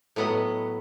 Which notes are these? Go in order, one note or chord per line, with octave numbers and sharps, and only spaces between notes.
A2 F#3 B3 D#5 F#5